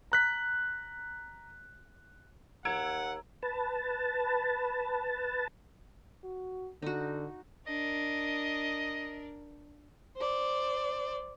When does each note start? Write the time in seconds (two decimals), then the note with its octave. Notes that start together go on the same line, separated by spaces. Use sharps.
0.12 A#5 F#6 B6
2.65 D#2 F#5 A#5 E6 G#6 D7
3.43 B4 A5
6.24 F#4
6.82 D3 D#4 F#4
7.67 D4 A#4 D#5
10.17 C5 D5